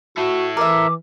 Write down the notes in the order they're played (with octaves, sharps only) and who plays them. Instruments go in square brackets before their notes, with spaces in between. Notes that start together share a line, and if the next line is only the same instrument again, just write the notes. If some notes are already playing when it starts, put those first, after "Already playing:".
[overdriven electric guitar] E4 A4 [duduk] F#4
[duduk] E3 [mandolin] A#4 E5 [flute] D6